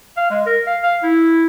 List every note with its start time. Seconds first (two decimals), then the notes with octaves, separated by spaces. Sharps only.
0.17 F5
0.30 G#3
0.47 A#4
0.67 F5
0.83 F5
1.03 E4